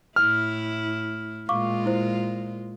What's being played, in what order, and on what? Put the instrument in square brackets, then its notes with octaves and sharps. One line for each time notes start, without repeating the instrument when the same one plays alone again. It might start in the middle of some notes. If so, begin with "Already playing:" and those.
[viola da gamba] A2 E4 [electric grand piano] F6
[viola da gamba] A#2 G#3 F4 [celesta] F5 C#6 D6
[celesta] E4 C5